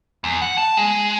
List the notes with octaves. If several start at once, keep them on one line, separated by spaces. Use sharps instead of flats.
E2
F#5
A5
G#3